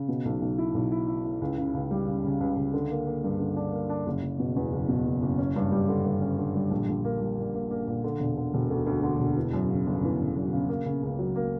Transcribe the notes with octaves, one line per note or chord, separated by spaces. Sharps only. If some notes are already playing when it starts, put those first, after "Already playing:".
Already playing: C#3
B2
B1
B1
E4
B1
E4
E4
E4
C#2
C#3
C#2
G3
C#3
C#3
C#2
C#2
D3
A#3
A#3
G2
D3
D4
A#3
D4
F#1
F#1
B2
E2
F#1
B2
F#1
F#1
C#4
G2
G3
D3
G2
C#4
D3
G3
A#1
A#1
A#3
G3
A#2
A#3
A#3
A#2
D3
E1
D3
E1
D2
D2
D3
E1
E3
F#2
C#3
G1
E3
C#3
F#2
C#3
A#3
C#3
C#2
F#3
A#3